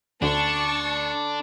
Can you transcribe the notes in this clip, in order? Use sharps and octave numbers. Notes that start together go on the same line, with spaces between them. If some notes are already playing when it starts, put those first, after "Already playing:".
D2 D3 D4 A5 C#6